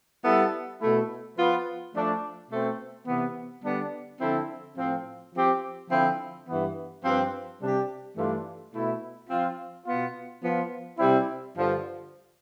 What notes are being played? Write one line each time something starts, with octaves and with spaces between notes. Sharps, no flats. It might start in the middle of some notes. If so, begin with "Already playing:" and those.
G3 B3 E4 A4
B2 A3 E4
F3 B3 F4 B4
F3 A3 D4
B2 A3 C4
C3 E3 B3
D3 G3 B3 D4
D3 F3 C4 E4 A4
A2 F3 C4
F3 C4 G4
D3 F3 C4 E4
G2 E3 B3
G2 F3 C4 G4 B4
C3 G3 D4 G4
G2 E3 A3 D4 F4
B2 A3 E4
F3 C4 F4
B2 B3 F4
F3 B3 F4
C3 G3 C4 E4
G2 D3 F3